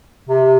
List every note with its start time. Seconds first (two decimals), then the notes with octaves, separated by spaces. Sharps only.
0.29 C3